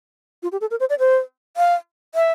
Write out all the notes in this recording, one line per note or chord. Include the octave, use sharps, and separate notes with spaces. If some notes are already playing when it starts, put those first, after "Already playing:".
F4
G4
A4
A#4
C5
D5
C5
F5
E5